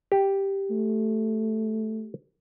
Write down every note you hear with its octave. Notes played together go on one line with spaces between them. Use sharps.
G4
A3